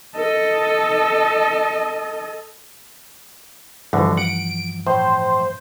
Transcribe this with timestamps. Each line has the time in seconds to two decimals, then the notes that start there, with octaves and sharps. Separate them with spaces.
0.16 A4 D#5
3.93 D2 G2 B2 D3 E3 F3
4.17 F#5 D7
4.87 A2 C5